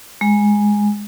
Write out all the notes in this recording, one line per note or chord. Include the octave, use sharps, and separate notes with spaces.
G#3